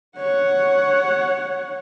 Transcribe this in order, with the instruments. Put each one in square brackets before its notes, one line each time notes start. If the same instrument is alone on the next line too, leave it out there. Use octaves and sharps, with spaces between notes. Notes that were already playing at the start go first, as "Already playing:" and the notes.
[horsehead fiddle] C#5 F#5